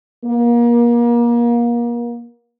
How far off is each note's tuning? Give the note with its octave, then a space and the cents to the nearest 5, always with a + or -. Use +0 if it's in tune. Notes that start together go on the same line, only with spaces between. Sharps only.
A#3 +30